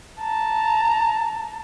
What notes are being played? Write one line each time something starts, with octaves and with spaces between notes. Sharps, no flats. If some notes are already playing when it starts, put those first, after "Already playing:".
A5 A#5